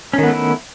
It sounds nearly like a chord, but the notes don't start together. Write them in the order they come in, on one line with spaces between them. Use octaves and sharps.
C#4 D#3 B3 A3 E4